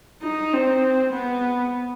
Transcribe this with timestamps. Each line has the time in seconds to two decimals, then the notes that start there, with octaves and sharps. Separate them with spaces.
0.23 D#4
0.53 C4
1.14 B3